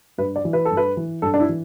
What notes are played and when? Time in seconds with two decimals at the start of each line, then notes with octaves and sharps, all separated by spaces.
0.18 G2 B4
0.36 D5
0.45 E3
0.53 B4
0.65 A4
0.71 G2
0.77 B4
0.97 E3
1.22 G2 A4
1.34 D4
1.40 E4
1.49 E3